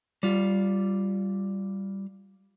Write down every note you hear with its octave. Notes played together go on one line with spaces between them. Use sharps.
G3 F4